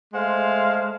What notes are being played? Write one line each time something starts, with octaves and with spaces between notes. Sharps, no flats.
G#3 A3 C5 F5